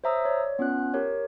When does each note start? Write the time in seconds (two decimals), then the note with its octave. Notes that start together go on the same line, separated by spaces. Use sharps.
0.04 C5 C#5 E5 A#5 D#6 E6
0.25 C#5 D5
0.59 B3 C#4 F4 F#6
0.94 G4 A#4 C#5